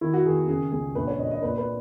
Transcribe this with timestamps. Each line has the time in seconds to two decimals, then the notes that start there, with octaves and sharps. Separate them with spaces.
0.01 D#3 E4
0.13 F#4
0.25 D#3 G#4
0.48 C#3 G#4
0.72 C#2 G#4
0.95 A#1 B4
1.07 C#5
1.19 A#2 D#5
1.31 D#5
1.43 A#2 B4
1.58 B4